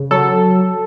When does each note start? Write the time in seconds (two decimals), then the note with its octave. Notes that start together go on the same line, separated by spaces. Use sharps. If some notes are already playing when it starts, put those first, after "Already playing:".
Already playing: C#3
0.11 F#3 A4